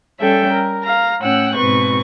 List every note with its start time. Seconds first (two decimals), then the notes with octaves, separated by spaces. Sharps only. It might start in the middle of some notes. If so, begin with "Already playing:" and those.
0.20 G3 C#4 A4 E5 G5
0.52 A#4
0.83 F5 A#5
1.20 A2 C#4 F#5 G5 E6 F#6
1.55 G#2 B2 C4 B4 C#6